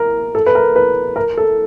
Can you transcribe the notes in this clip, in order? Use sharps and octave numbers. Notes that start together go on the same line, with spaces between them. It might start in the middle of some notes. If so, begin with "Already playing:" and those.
Already playing: A#4
A4
B4
A#4
B4
A#4
A4